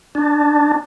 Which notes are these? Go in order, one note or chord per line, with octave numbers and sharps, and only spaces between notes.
D4